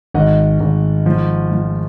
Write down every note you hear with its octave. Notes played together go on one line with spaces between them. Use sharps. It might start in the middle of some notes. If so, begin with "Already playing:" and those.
G#1 D#5 F#5
G#1
F3
F3